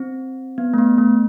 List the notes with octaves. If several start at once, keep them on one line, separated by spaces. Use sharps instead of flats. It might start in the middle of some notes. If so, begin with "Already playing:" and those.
Already playing: C4
B3
A3
B3
A3